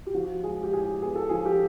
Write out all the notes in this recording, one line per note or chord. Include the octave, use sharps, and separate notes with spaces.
G4
F3 F#4
G#3 G#4
G4
A2 G#4
B3 G#4
A4
F3 G#4
G4